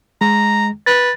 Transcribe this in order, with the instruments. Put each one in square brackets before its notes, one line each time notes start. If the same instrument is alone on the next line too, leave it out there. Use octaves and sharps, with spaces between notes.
[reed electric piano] G#3 [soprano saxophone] A#5
[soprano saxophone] B4 [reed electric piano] A6